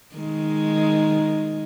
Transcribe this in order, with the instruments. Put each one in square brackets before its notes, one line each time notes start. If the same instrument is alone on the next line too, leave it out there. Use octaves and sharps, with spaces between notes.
[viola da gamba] D#3 G#3